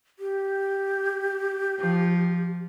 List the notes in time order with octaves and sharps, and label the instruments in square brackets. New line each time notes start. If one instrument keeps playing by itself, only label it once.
[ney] G4
[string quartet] F3